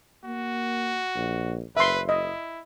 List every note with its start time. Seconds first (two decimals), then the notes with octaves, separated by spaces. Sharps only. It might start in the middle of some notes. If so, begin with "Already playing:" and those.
0.25 A#3 F#4
1.16 A#1
1.77 F#1 B4 E5 C6
2.09 E4 D#5